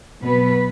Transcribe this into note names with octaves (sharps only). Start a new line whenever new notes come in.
B2 F#3 B3 B4